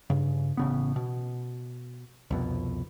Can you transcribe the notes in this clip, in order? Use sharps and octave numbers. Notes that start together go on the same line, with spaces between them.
G2 C#3
A1 C#3 B3
B2
C2 F2 B2